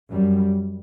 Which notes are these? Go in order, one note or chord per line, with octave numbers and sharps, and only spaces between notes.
F#2 G3